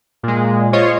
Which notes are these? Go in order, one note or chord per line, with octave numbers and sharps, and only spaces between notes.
A#2 G#3
F4 C5 C#5 D#5